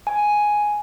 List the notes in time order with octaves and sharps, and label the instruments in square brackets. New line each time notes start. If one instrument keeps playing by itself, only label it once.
[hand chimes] G#5